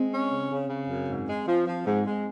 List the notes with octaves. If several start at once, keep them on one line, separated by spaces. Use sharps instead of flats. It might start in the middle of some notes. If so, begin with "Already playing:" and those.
Already playing: G#3 C4
C#4
C#3
C#3
C#3
F#2
G#2
G#3
F3
F3
G#2
G#3